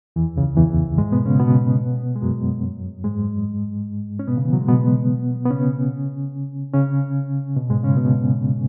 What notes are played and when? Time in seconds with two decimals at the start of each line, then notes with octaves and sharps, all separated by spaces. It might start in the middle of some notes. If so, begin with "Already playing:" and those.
0.16 E2 E3
0.36 C#2 C#3
0.57 E2 E3
0.98 G#2 G#3
1.12 B2 B3
1.26 C#3 C#4
1.40 B2 B3
2.16 G#3
2.22 F#2 F#3
3.04 G#2 G#3
4.19 C#4
4.27 B2 B3
4.37 C#3
4.45 E3
4.53 F#3
4.61 G#3
4.68 B2 B3
5.45 B3
5.51 C#3 C#4
6.73 C#3 C#4
7.56 B2
7.70 G#2 G#3
7.83 C#3 C#4
7.97 B2 B3